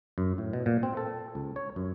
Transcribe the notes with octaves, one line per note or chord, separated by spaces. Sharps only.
F#2
A2
B2
A#2
C4
A4
C#2
C#5
F#2